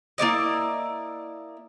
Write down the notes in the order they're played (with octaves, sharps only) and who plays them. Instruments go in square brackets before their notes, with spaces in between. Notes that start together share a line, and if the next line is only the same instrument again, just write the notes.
[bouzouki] A#3 E4 D5 D#5